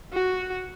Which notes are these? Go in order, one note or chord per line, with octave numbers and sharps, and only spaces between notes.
F#4